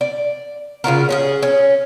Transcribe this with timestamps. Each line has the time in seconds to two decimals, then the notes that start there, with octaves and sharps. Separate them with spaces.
0.01 D5
0.84 C#3 F4 F#4 A#4
1.09 C#4 F#4 G#4
1.42 C#4